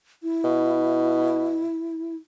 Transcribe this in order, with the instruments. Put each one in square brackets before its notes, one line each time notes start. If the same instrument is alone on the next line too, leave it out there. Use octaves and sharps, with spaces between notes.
[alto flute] E4
[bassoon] B2